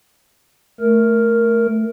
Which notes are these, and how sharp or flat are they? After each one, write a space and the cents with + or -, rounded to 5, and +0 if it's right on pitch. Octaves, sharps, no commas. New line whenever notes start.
A3 +0 A#4 +0